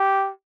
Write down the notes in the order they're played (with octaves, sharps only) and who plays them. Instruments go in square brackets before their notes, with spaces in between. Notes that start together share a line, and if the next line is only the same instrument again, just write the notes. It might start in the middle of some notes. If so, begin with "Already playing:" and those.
Already playing: [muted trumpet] G4